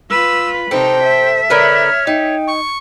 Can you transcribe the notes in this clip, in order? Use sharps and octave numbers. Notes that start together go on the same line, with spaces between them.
F4 B4 E6
C3 D#4 A4 C5 G5
E5
D3 A#4 B4 C#5 F6
D#4 G5
C#6